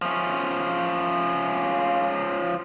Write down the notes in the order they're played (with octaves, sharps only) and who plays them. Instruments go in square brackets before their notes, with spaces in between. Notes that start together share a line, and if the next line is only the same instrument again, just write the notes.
[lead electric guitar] F3 C#4